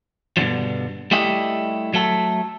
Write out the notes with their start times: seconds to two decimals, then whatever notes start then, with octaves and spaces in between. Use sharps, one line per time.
0.37 G2 B2 D3 D#3 F3
1.11 G3 A3 E4 G4 D#5
1.94 F#3 A3 A4